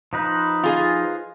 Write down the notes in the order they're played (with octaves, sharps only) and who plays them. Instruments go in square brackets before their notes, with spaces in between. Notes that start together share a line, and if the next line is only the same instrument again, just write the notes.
[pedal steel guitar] F3 D#4 B4
[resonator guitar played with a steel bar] F4 G#4